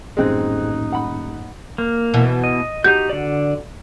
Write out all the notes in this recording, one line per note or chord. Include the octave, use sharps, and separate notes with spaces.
D#1 A1 F#2 G#3 C4 D#4 F#6
F#5 B5
A#3
B2 E3
D#5
D#4 F#4 G4 G6
D3 D5